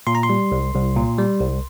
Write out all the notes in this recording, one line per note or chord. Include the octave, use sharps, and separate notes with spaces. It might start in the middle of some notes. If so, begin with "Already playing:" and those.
A#2 C6
A#5
C6
G3
C2
C2
A#2
G3
C2